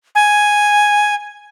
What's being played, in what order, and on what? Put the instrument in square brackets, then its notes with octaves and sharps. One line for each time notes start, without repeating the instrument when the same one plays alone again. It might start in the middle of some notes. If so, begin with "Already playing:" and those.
[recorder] G#5